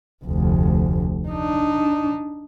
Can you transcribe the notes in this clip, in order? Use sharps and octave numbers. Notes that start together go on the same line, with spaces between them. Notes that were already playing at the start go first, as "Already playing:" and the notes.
F1 D2
D4 D#4